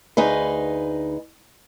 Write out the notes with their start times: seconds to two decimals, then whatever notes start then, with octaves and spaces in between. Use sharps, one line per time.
0.17 D2 D#4 G#4 B4